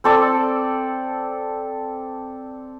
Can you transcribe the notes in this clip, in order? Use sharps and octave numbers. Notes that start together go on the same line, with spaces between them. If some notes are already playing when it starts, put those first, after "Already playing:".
C4 A4 D5